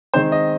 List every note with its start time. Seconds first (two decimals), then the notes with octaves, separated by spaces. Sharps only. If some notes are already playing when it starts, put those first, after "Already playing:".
0.14 D#3 G#3 C4 D#4 C5
0.32 D#5